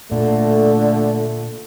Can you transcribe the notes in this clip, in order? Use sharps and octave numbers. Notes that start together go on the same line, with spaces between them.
A#2 D3 A3